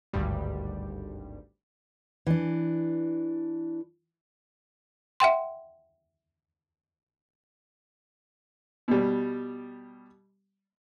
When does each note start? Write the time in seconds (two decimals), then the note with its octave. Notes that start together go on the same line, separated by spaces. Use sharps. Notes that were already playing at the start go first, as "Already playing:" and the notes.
0.13 G#1 D2 G2 G3
2.27 E3 D4
5.20 E5 F#5 G5 C6
8.88 B2 G3